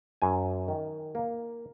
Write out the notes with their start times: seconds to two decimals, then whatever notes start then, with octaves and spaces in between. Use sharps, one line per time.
0.22 F#2 G#5
0.68 D#3
1.15 A#3